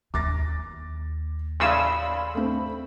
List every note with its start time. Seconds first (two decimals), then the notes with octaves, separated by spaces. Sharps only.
0.14 D#2 D6 A6 A#6
1.60 A1 C#3 D5 F5 B5 C6 E6
2.35 A3 C4